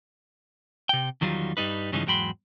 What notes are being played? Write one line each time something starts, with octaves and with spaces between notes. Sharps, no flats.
C3 G5
E2 D#3 F#3 G3 F4
G2 G3 D#4 B4
G2 C#3 E3 F3 G#3 D#4
E2 G#2 F#3 G5 B5 C6